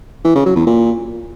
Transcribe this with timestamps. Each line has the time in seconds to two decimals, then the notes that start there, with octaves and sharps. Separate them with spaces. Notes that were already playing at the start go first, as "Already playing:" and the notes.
0.25 E3
0.35 C#3
0.46 F#3
0.56 E2
0.66 A#2